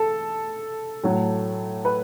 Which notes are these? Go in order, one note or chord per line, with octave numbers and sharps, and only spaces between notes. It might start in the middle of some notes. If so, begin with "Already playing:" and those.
Already playing: A4
A2 F#3 A3
B4